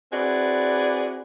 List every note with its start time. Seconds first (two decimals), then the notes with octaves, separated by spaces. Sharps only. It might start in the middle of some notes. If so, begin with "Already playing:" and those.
0.12 C4 E4 F#4 G#4 B4 D5